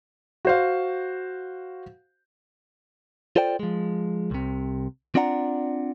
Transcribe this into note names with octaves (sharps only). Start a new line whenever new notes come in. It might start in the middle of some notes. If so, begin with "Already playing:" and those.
F#4 C5 F5
F4 A4 C5 D5 G5
F3 G#3
C2 C3
C4 D4 F4 D5 F#5 A#5